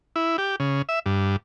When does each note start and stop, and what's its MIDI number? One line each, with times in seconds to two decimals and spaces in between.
0.16 0.37 64
0.38 0.56 67
0.60 0.82 49
0.89 0.99 76
1.06 1.36 43